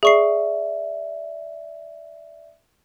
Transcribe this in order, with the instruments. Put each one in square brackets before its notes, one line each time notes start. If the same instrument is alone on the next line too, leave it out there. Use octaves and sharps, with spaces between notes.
[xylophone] G#4 C#6 C7 [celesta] D5 E5